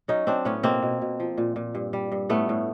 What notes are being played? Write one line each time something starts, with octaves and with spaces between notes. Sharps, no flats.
F#3 C#4 D#4
F#3 C4 D4
A2 B3 C#4
B2 A#3 C4
B2
B2
F3
A#2
A#2
G2
G3
G2
A2 A3 B3
A2